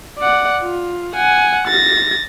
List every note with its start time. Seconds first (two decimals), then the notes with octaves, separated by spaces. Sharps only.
0.19 D5 F#5
0.63 F4
1.14 F#5 G#5
1.68 A6 A#6